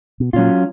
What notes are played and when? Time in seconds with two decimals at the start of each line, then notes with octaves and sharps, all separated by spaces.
0.20 B2
0.33 A#2 F#3 C#4 F4